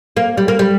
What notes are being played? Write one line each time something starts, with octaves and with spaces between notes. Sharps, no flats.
A#3
G3
A#3
G3